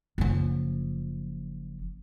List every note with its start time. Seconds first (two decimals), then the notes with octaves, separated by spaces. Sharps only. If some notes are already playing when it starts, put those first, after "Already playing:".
0.18 F#1 F3